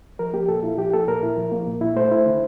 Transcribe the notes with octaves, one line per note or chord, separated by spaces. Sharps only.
F3 A#4
A#3 G4
A#2 A4
E4 F4
F3 G4
A#3 A4
A#2 A#4
E4
F3
A#3
A#2
E4
A3 C5
E4
D3